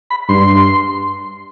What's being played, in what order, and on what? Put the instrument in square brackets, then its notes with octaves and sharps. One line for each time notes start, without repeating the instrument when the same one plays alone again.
[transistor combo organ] B5
[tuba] G2 [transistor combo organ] C6